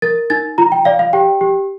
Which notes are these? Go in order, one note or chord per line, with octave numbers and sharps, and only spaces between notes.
A#4 A6
D#4 A6
F4 A#5
G5
D5 F5
F5
G4 G5
G4